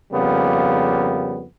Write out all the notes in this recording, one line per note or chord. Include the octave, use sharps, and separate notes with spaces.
F2 C#3 G3 A#3 B3